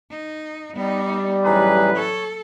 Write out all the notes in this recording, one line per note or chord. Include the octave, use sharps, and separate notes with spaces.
D#4
G3 B3 D#4
A1 A2 F#3 D#4 G#4 B4
A4 C#5